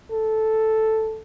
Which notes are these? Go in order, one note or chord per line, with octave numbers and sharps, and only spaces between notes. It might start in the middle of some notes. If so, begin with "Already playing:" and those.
A4